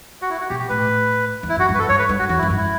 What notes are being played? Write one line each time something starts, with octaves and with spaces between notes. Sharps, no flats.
F#4
E4
F#4
B2 G4
G4
A2 B4
E2
E4
F#2 F#4
G2
B4
A4
G2 C#5
B4
G2
F#4
E2 F#4
F#2 E4
G2
E4